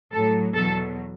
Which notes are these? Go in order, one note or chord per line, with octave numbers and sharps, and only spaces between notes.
A2 F#3 A4
E2 B2 F#3 A4